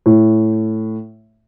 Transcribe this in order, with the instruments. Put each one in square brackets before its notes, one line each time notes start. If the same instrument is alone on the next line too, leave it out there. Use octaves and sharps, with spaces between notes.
[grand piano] A2